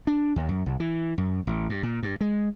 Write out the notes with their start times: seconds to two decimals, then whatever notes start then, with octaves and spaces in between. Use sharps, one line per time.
0.07 D4
0.36 D#2
0.49 F#2
0.66 C2
0.80 E3
1.18 F#2
1.47 A1
1.70 G2
1.83 A#2
2.03 G2
2.21 G#3